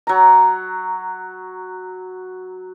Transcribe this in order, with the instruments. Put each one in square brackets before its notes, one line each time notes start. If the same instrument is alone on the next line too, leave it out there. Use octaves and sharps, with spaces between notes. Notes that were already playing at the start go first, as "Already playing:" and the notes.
[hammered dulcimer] F#3 A#5